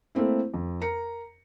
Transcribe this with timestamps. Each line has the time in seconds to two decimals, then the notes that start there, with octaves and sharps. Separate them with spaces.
0.15 A3 A#3 C4 E4
0.54 F2
0.81 A#4 A#5 C#7